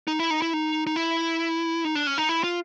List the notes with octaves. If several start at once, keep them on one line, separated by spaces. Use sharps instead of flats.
D#4
E4
D#4
E4
D#4
D#4
E4
D#4
D4
C#4
D#4
E4
F4